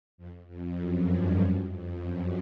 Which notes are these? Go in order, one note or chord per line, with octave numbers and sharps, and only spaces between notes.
F2
F2
F#2
G2
F#2
F2
F#2